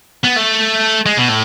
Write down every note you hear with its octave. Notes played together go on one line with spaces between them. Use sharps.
B3
A3
G#3
B2
A2